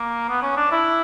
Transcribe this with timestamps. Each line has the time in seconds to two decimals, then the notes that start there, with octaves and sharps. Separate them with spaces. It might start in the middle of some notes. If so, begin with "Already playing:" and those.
Already playing: A#3
0.29 B3
0.43 C#4
0.57 D4
0.72 E4